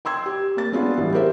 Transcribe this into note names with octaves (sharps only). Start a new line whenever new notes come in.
G5 C6 E6 G#6
G4
A#3 A6
G#3 B3 D4 F4 F#4
A1 E3 G3
G4 G#4 A#4 C5 E5